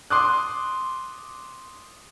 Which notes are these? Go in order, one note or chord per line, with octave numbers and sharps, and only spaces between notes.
C6 D6 D#6 F#6